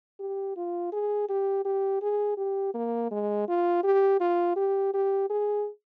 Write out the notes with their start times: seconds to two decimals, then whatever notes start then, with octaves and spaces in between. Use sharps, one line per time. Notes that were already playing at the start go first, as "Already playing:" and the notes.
0.20 G4
0.56 F4
0.92 G#4
1.29 G4
1.65 G4
2.02 G#4
2.37 G4
2.75 A#3
3.11 G#3
3.48 F4
3.84 G4
4.20 F4
4.56 G4
4.94 G4
5.30 G#4